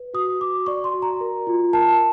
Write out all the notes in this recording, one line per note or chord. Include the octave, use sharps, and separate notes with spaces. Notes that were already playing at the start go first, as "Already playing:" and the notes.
Already playing: B4
F#4 D#6
F#4 D6
D5 C#6
C6
F#4
A#5
A#4
F4
A#4 A5